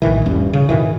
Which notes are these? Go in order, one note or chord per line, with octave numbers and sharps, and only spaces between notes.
A#1 A2 D#3 E3
D#1 A1 G2 C#4
C#3
G#2 B2 D#3 E3